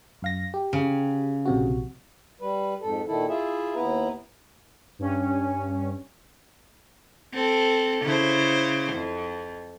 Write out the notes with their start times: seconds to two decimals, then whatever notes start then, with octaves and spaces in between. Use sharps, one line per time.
0.22 F#2 F5 A#6
0.54 G4
0.73 C#3
1.45 A#1 C3 F#4
2.41 G3 B4
2.82 F2 G#2 A4
3.08 A#2 D#3 E4 A4
3.29 E4 F4 G#4 E5
3.76 D#2 B3 E4 B4 A#5
4.99 G2 C#4
7.34 C4 A4
8.03 C#3 E4 C5
8.93 F2